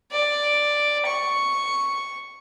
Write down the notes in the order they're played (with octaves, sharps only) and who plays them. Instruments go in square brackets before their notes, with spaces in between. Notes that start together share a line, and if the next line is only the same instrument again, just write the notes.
[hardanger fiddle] D5
C#6